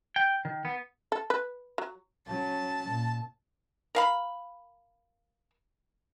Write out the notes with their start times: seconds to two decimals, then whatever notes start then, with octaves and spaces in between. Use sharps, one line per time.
0.16 G5
0.45 D#3
0.65 B3
1.12 A4
1.30 B4
1.78 F#3
2.27 F#3 C#4 A5
2.89 A#2
3.95 A#4 F5 B5